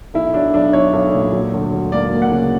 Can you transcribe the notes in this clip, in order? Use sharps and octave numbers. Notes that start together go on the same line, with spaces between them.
B1 E4
F#3 D4
B1 D4
B1 C#5
B1
A#2
F#3
D2
F#3
A#3 D5
A#3
F#5
C#3